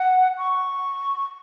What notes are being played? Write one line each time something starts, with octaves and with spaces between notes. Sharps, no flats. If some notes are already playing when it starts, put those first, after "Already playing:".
Already playing: F#5
C#6